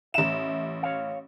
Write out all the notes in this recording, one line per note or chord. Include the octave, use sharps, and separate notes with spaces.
A1 E5 E7
C#5 F5